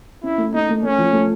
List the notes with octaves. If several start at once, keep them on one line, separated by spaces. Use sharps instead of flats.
C#4 E4
A3
A3 D#4
A3
A3 C#4
F3
A3